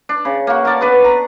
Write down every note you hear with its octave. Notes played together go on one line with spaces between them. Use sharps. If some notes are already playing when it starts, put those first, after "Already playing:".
D4
C#3
A#3 F#4
A#4 D5 A5
B3 D4 B4
A#5